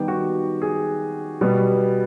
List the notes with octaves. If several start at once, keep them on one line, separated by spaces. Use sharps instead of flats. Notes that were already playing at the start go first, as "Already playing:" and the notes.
Already playing: D#3 G3 B3 G4
F#4
G#4
B2 G3 B3